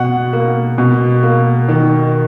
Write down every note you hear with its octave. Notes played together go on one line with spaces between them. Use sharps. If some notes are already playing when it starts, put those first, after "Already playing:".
Already playing: B2 F#5
A#3
B2
A#3
D#3